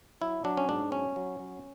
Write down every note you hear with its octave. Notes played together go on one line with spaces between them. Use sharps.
F#3 E4
F#3 D4
C#4
G#2 D4
F#3 C#4
F#3
F#3